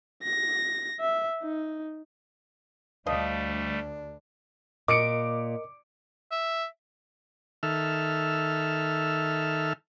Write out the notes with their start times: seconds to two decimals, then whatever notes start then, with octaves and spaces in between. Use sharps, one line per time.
0.23 A#6
1.01 E5
1.43 D#4
3.06 D2 F3 G3 A3 D4 D#5 F5
4.88 A#2 A#4 D#5 D6 C#7 D7
6.31 E5
7.63 D#3 A4 E5 F6